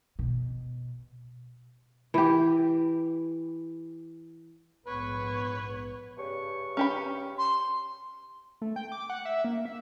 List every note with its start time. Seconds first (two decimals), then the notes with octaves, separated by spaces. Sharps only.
0.19 B2
2.14 E3 G4
4.87 A#1 G#2 B3 B4 C#5
6.18 G2 C#3 C#6
6.77 C#4 G4 B5
7.38 C6
8.62 A3
8.76 G5
8.92 D6
9.10 F#5
9.25 E5
9.45 A#3
9.65 E5